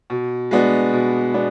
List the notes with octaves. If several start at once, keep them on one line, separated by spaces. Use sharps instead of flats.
B2
G#3 B3 D4 F#4
B2
G#3 B3 D4